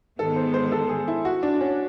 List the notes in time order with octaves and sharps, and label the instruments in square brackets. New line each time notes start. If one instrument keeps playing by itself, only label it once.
[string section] G#2 D#3 G#3 B3 [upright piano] A4
[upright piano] C5
C5
A4
G#4
E4
F#4
D4
C#4